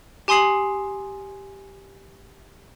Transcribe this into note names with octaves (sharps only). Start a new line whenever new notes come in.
G4 G#5 C6 D#6 C7 F#7